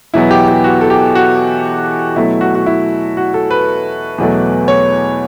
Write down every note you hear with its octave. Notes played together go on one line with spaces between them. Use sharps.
E2 B2 F#3 B3 E4
G4
G4
F#4
A4
G4
F#4
B2 F#3 A3 E4
F#4
F#4
E4
F#4
A4
B4
E2 B2 F#3 A3
C#5